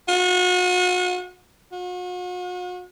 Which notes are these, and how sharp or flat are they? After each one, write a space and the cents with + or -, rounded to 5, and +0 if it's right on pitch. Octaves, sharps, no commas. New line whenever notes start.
F#4 -40
F#4 -45